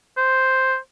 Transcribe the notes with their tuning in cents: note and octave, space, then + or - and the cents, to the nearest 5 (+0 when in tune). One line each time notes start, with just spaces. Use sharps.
C5 +0